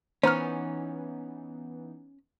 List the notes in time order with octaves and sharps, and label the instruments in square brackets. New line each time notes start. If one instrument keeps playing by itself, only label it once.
[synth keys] E3 B3 D#4 [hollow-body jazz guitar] C#4 [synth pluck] C5 A#5 F6